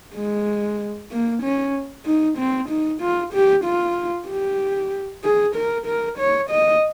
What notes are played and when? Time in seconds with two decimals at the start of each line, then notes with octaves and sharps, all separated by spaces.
0.15 G#3
1.11 A#3
1.42 C#4
2.06 D#4
2.38 C4
2.69 D#4
3.01 F4
3.33 G4
3.65 F4
4.29 G4
5.24 G#4
5.56 A#4
5.86 A#4
6.19 C#5
6.50 D#5